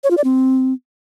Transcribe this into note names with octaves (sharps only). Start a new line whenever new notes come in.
C#5
F4
D5
C4